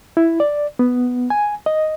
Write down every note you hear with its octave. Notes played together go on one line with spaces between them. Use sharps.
E4
D5
B3
G#5
D#5